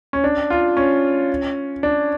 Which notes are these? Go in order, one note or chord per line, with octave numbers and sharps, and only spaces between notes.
C#4
D4
F4
C#4
D4